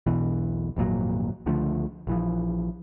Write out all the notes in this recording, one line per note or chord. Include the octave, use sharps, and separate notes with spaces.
B1 E2 B2 E3
G#1 F2 A#2 F#3
C#2 D3 F3 A3
A#1 E3 F3